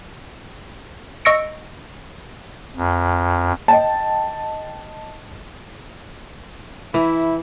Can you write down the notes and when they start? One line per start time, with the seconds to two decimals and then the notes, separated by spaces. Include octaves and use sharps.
1.25 D#5 C#6 E6 A#6 C#7 D7
2.76 F2
3.68 D#5 G5 A5
6.94 E3 E4